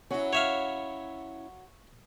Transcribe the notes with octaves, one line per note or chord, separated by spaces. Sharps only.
F#3 C#4 E4 F#4
C#5 E5 F5